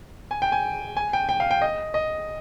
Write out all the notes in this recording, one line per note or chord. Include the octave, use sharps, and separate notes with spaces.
G#5
G5
G#5
G#5
G5
G5
F5
G5
D#5
D#5